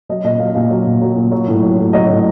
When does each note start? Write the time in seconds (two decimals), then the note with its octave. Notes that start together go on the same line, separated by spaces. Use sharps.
0.09 F#3 D#5
0.24 A#2 D#5
0.40 F#3 F5
0.55 A#2 F5
0.70 F#3
0.87 A#2
1.02 F#3
1.16 A#2
1.32 F#3
1.48 A2
1.62 F#3
1.78 A2
1.93 F#3 D#5
2.10 A2